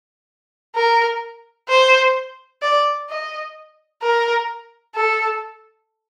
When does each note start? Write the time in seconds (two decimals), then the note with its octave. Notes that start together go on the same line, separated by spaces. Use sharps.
0.76 A#4
1.69 C5
2.62 D5
3.09 D#5
4.03 A#4
4.96 A4